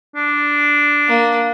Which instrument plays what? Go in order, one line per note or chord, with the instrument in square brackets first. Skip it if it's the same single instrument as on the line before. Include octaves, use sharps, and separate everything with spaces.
[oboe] D4
[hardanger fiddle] A#3